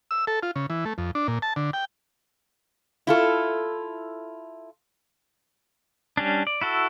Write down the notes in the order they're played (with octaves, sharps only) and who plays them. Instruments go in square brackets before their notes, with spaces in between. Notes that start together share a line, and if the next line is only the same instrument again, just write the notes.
[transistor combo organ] E6
A4
F4
C#3
E3
A3
F2
D4
A#2
A5
D3
G5
[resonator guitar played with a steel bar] E4 F4 A4
[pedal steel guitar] G3 C#4 D4
D5
E4 F#4 A4